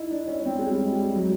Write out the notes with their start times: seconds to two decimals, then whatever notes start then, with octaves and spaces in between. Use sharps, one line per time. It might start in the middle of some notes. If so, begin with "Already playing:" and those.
Already playing: D#4 E4
0.10 D4
0.28 C#4
0.46 C4
0.59 G#3
0.69 G3
0.92 G3
1.16 F#3